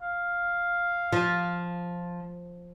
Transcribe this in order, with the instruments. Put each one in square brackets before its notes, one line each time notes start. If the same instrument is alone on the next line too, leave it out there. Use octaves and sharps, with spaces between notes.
[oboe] F5
[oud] F3